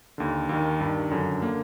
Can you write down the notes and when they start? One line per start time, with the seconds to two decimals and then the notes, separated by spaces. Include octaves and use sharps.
0.18 D#2 D3
0.49 D#2 D#3
0.80 G2 D#3
1.11 F#2 D3
1.42 D3 A#3